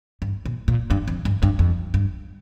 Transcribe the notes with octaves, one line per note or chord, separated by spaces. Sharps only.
G2
A#2
A#2
G2
F2
G2
G2
F2
G2